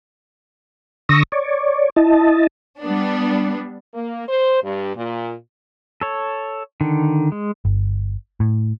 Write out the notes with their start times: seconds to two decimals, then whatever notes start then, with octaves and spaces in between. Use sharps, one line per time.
1.09 D3 C#6 D#6 E6 A#6
1.32 C#5 D5
1.96 E4 D#5 A5
2.80 G3 B3 D4
3.94 A#3
4.28 C5
4.63 G2
4.96 A#2
6.01 A4 C#5
6.81 D3 D#3
7.32 G#3
7.65 G1
8.40 A2